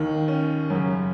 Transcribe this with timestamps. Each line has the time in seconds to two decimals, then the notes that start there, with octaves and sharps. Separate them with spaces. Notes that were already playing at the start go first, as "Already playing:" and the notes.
Already playing: D#2 D#3
0.28 C#4
0.70 F#2 C#3 C#4